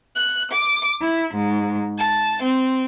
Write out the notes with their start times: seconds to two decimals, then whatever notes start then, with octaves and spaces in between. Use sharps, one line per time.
0.16 F#6
0.51 D6
1.01 E4
1.35 G#2
1.99 A5
2.42 C4